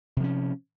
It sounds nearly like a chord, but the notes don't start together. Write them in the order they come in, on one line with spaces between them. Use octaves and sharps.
C3 F3 C#4